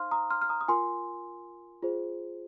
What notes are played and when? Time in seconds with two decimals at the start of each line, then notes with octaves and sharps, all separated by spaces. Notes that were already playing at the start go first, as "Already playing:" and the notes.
Already playing: D#4 C5 F5 C6 F6
0.11 A#5 D#6
0.30 C6 F6
0.42 F6
0.49 A#5 D#6
0.61 D#6
0.68 F4 A#4 G#5 C6
1.82 F4 G#4 C5